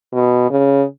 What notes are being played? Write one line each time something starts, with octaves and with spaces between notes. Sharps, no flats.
B2
C#3